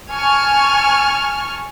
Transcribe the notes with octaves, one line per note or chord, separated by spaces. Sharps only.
G#5 A5 C#6 F6